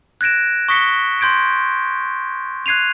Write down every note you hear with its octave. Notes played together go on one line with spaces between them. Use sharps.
F#6 G#6 A#6 D7 E7
C#6 D#6 A#6 B6 C#7 G7
C6 G6 G#6 D7
F#6 G#6 C7 D#7 F7